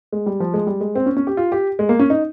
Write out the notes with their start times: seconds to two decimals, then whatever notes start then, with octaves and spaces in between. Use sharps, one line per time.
0.12 G#3
0.26 G3
0.40 F3
0.54 G#3
0.67 G3
0.81 G#3
0.95 C4
1.06 C#4
1.17 C#4
1.27 G4
1.37 F4
1.52 G4
1.79 G#3
1.89 A#3
1.99 C#4
2.10 D#4